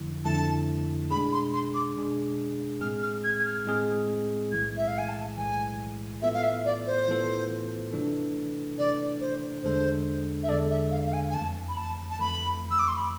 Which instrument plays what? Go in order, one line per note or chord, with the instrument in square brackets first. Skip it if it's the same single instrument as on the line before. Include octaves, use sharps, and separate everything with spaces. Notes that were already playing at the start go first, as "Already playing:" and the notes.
Already playing: [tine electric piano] F2 D3 F3 A3 E4
[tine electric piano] F2 D3 F3 A3 E4 [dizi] A5
[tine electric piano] B2 G#3 D4 G#4 [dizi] B5
[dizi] C6
C6
D6
[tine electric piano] B2 G#3 D4 G#4
[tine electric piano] A2 G#3 C4 G#4 [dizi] F6
[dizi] F6
G#6
G#6
F6
[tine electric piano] A2 G#3 C4 G#4
[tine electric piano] B1 A2 E3 G#3 [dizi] G#6
[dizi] E5
F5
G#5
A5
[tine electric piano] B1 A2 E3 G#3 [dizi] G#5
[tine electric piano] A2 E3 B3 F4 A4 [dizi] E5
[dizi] F5
E5
D5
C5
[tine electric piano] A2 E3 B3 F4 A4
C3 E3 A3 D4 A4
[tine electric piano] C3 E3 A3 D4 A4 [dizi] D5
[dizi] C5
[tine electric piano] E2 D3 G#3 D4 A4 [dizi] C5
[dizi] E5
[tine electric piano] E2 D3 G#3 D4 A4 [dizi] D5
[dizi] E5
F5
F5
G#5
G#5
[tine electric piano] F2 E3 A3 [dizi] A5
[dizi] B5
A5
A5
[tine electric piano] F2 E3 A3 [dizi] B5
[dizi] E6
D6
C6
B5